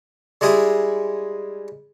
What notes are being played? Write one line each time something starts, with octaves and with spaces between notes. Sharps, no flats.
G3 G#3 E4 G#4